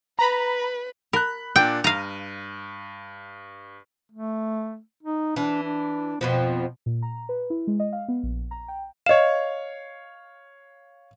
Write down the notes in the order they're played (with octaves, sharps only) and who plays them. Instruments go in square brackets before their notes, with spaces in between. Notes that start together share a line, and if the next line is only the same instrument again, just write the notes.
[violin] B4 [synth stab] A#5 B5
[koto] A#4 [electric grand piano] B5 F#6
[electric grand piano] A#2 D4 [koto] G5
[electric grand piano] G2 D#7 [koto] F5 A#5
[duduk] A3
D#4
[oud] E3 [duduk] D4
[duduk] D4
[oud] F2 B2 F3 [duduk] B3
[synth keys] A#2
A#5
B4
E4
G#3
D#5
F5
B3
A#1
A#5
G5
[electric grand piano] C#5 F5 [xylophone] D#5 E7